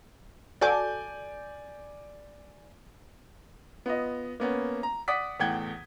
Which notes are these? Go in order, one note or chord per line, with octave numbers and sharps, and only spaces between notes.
F#4 A4 D5 G#5 D6 G6
B3 F4 D#5
A#3 B3 C#4
A#5
D5 F#5 D6 D#6 B6
E2 A2 F#5 G5 G#6 G7